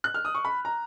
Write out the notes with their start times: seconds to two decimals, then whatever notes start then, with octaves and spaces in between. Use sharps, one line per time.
0.04 F#6
0.14 F6
0.25 D#6
0.35 C#6
0.45 B5
0.65 A#5